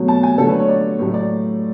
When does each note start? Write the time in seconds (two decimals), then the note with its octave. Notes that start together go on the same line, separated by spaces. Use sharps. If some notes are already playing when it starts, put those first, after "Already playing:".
Already playing: B2 F#3 A3
0.08 A5
0.23 G#5
0.38 D3 F#3 A3 A4
0.49 B4
0.59 C#5
0.69 D5
0.99 A2 F#3 A3
1.14 D5